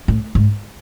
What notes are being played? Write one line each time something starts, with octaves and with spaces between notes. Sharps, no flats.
A2
G#2